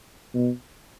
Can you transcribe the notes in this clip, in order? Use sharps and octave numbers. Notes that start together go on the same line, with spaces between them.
B2